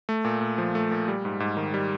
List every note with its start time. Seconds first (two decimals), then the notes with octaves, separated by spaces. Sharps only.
0.09 A3
0.25 A#2
0.41 A#2
0.58 F3
0.75 A3
0.91 A#2
1.08 G3
1.25 G#2
1.40 G#2
1.57 D#3
1.74 G3